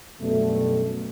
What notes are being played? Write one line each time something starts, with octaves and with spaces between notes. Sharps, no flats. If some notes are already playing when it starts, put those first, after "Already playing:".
F#2 B2 D3 G3 A3